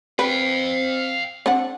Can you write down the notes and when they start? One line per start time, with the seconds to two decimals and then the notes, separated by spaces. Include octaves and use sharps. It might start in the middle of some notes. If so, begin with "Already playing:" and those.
0.19 C4 B4 F5 G5
1.46 C4 D4 F#5